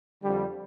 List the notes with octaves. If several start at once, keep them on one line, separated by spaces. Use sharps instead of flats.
F2 D3 G3